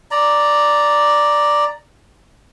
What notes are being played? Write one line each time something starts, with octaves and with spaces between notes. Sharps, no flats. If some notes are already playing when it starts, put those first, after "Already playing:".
D5 A#5